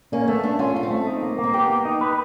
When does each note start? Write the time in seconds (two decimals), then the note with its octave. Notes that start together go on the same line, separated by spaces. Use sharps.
0.12 A#3 C#4
0.27 A3 B3
0.44 A3 D4
0.59 C#4 F4
0.75 C#4 F4
0.83 C4
0.91 A3
1.07 D#4
1.23 A#3
1.39 A#3
1.44 C4
1.54 B3 G4
1.70 A#3
1.85 D#4
2.01 B4